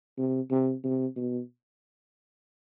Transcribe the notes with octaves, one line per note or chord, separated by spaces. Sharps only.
C3
C3
C3
B2